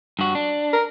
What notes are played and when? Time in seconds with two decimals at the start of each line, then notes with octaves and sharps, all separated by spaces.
0.19 G2 F#4
0.35 D4
0.73 A#4